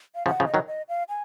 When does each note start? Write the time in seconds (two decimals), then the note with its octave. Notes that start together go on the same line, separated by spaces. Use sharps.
0.15 F5
0.26 C#3 F3 F#5
0.40 C#3 F3
0.47 D#5
0.54 D#3 F#3
0.68 D#5
0.89 F5
1.09 G#5